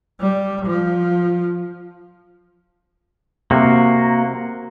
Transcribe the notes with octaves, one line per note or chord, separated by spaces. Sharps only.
G3
F3
C3 A#3 F#4